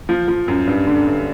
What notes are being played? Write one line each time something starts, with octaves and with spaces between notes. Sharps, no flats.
F3
F3
F#2
G2
D3
G2